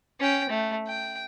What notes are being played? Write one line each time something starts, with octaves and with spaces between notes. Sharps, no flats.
C#4 G5
A3
G5